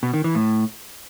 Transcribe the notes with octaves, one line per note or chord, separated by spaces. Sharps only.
B2
D#3
E3
A2